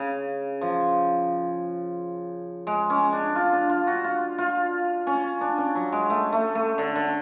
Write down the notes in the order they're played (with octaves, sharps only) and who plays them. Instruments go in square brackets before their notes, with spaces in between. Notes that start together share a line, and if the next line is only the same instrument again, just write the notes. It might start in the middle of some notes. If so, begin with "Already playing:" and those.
Already playing: [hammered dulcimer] C#3
F3
G#3
C#4
D4
F4
D4
F4
F#4
F4
F4
C#4
D4
C#4
F#3
G#3
A3
A3
A3
D3
D3